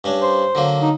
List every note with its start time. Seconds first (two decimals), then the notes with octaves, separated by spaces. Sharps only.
0.04 G2 C#4 D4
0.22 C5
0.55 D3 F#3 A#3
0.82 D#4